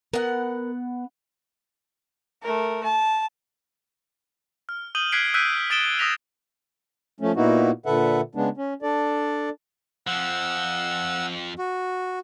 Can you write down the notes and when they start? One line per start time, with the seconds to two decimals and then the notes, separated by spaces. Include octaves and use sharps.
0.13 B3 A#4 F#5
2.43 A3 A#4
2.84 A5
4.69 F6
4.95 D#6 G6 D#7 F#7 G7
5.12 F6 F#6 G#6 B6 C7 D7
5.34 E6 F#6 G6 B6 D7 D#7
5.70 D#6 A6 B6 D7 E7 G7
5.99 D#6 E6 A#6 B6 F7
7.20 F3 A3 C#4
7.36 A#2 A#3 B3 D#4 E4 F#4
7.86 A#2 D3 A4 B4 E5 F#5
8.35 C#3 G#3 B3 D4
8.57 C#4
8.82 D4 A4 D5
10.07 F2 F3 F#5 E6
11.59 F#4